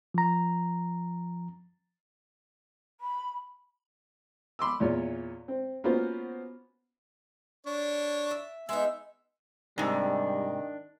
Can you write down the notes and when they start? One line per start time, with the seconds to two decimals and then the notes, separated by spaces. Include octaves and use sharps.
0.14 F3 A#5
3.00 B5
4.59 B5 C6 D6 E6
4.80 E2 A#2 F4 C#5
5.48 C4
5.84 A#3 B3 C#4 F4 F#4 C5
7.66 D4 C#5
8.31 E5
8.69 G#3 B3 D#4 E5
9.78 G#2 C3 D#3 G3 D4